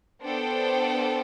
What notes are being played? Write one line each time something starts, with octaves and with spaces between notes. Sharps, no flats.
B3 D4 A4 C5 G5